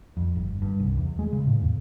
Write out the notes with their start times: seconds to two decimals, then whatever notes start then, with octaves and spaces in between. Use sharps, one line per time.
0.17 F2
0.35 G1
0.62 G2
0.80 C2
0.97 E2
1.19 G#3
1.32 C#3
1.47 A2
1.61 E2